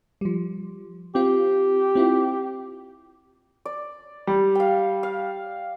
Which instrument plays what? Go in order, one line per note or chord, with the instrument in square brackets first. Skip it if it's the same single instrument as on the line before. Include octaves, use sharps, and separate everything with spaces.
[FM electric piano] F3 G3
[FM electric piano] C4 F4 [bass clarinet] G4
[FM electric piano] C4 E4 F4
[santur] D5
[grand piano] G3
[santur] F5 G5
F5